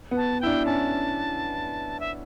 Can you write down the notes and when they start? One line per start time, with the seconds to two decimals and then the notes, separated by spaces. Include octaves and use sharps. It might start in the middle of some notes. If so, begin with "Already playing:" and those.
0.11 B3
0.17 A5
0.41 E4 G5
0.47 D4
0.65 C#4 A5
2.00 E5